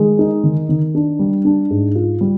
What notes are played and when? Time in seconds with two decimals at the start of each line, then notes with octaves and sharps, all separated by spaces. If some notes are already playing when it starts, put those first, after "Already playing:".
Already playing: D#3 G#3
0.19 D#4
0.43 D#3
0.69 D#3
0.95 D4
1.19 G3
1.45 D4
1.71 G#2
1.95 F4
2.21 G3